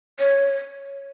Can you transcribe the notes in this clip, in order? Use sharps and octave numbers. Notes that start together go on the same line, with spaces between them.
C#5